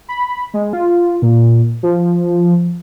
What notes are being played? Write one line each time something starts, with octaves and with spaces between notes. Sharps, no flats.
B5
G#3
F4
A#2
F3